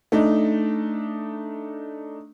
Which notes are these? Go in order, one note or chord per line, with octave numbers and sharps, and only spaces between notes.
A3 D4 D#4